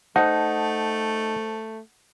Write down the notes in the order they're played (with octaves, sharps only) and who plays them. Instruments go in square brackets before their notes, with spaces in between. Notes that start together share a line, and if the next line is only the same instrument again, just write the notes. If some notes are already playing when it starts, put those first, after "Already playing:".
[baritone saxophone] A3 [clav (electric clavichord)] D#4 [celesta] C5 A5 [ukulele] F#5